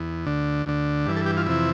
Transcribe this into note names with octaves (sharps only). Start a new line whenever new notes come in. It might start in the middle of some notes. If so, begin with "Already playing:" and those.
Already playing: E2
D2 D3
D2 D3
G2 E3 D4
A4
G4
F4
F2 C3 E3 E4